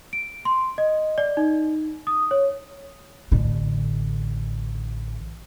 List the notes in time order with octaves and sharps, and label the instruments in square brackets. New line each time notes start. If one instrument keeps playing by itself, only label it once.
[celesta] D7
C6
D#5
D5
D#4
D#6
C#5
[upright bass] A1 D3